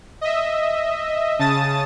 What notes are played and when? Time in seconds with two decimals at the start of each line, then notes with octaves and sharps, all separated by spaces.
0.21 D#5 E5
1.39 C#3 A5 D#6 A6